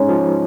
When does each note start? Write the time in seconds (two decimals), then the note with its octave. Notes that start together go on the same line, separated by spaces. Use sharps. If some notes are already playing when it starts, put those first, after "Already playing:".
Already playing: G#3 C#4 D#4
0.09 F3